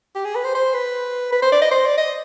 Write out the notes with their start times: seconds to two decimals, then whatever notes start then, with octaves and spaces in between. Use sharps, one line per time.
0.15 G4
0.25 G#4
0.35 B4
0.45 C5
0.55 C5
0.74 B4
1.32 B4
1.42 C5
1.52 D5
1.62 D#5
1.72 C5
1.85 D5
1.98 D#5